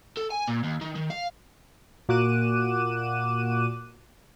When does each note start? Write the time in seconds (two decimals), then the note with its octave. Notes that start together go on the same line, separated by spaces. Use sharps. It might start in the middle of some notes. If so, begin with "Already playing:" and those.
0.17 A4
0.30 G#5
0.48 A#2
0.63 D#2
0.81 D#3
0.95 D#3
1.10 F5
2.09 A#2 F#4 D6 F#6 D#7 E7